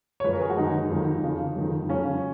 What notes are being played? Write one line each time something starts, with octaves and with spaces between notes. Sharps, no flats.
C#5
F#2 F3 G#3 B4
A#4
G#4
F#4
F#2 D#3 F#3 D#4
F2 D#3 F#3
F2 C#3 F3
F2 D#3 F#3
F2 C#3 F#3 C#4